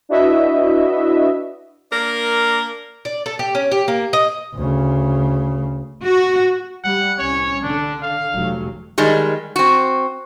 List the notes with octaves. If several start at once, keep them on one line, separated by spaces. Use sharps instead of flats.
D4 E4 F#4 B4 D#5 E5
A#3 D4 A#4
D5
A4
G4
C#4
G4
A#3
D#5
D2 C#3
F#4
G3 F#5
C2 C#4 C#5
D3 D4
F5
F1 F#3
D#3 G3 G#3
C4 F#4